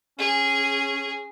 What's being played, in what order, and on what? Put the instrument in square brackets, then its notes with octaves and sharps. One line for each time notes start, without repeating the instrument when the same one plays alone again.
[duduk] C#4 [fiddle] G#4